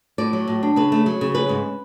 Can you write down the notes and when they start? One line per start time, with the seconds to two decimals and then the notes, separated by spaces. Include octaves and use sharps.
0.18 A2 D5
0.33 F#3
0.48 A2
0.63 D4
0.76 C#3 B4
0.92 A3
1.06 F#3
1.21 C#3
1.35 C#4 B4
1.49 G#2